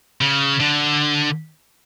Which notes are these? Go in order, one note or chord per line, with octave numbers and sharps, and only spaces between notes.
C#3
D3